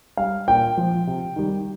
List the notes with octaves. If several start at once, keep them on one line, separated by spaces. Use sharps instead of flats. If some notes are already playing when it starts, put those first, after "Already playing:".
G3 F5
A#2 G5
F3
C3
D#3 G3